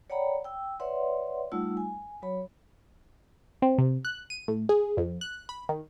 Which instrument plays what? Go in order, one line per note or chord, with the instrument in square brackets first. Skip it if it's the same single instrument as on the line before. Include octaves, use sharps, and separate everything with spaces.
[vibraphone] C#5 D5 F#5 G5 A#5 B5
G5 E6
B4 C#5 D5 E5 F#5 C6
G3 A3 D#4 F4 F#5 E6
G#5
F#3 F#4 C#5 B5
[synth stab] C4
C3
F#6
D#7
A2
G#4
F2
F#6
B5
D#3